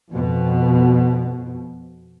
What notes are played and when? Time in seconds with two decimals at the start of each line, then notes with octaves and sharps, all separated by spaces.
0.10 F2 B2